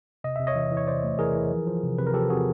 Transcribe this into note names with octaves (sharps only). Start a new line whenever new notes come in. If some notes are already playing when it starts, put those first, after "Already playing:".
C3 D#5
C3 E5
C#5 D#5
E3
E3
C#5
C3 C5 D5
A3
E3 G#4 A#4
E3
F3
F3
C3
C3 B4
A#4
F3 G4 A4
C4 F#4 G#4